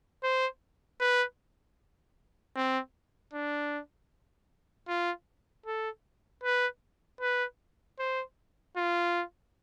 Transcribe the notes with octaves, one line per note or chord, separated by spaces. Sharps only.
C5
B4
C4
D4
F4
A4
B4
B4
C5
F4